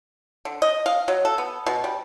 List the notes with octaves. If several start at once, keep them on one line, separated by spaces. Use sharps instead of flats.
D3
D#5
F5
F#3
A4
B3
B2
G3